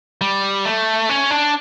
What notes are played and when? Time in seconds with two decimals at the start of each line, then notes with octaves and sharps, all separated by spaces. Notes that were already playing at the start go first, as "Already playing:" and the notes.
0.21 G3
0.65 A3
1.09 C#4
1.31 D4